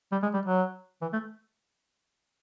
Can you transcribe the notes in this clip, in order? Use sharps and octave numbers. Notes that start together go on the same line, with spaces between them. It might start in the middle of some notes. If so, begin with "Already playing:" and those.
G3
G#3
G3
F#3
E3
A3